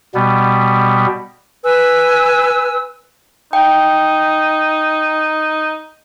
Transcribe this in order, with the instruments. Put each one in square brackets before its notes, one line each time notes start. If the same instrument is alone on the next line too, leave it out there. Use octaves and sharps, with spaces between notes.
[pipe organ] B2 G3 B3
[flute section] B4 G#5 E6
[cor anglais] D#4 [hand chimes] G5